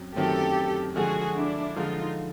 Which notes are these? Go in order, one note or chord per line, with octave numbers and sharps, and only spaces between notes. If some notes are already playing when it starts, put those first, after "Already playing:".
Already playing: F#2 F#3 C4
F#2 D#3 F#3 A3 C4 G4 A4
D3 F3 G#3 F#4 G#4
D4 E4
D3 F3 G#3 D#4 F4